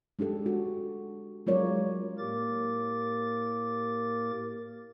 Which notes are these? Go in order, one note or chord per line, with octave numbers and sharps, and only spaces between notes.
G#3 D4 G4 A4
F#4
F#3 G#3 F4 A#4 C#5 D5
A2 A#3 G4 A#4 D6 A6